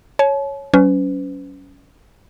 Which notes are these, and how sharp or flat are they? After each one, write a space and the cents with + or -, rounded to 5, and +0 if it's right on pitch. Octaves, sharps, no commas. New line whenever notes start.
C#5 +0 A5 -40
F#3 +45 C#4 +15 B4 +40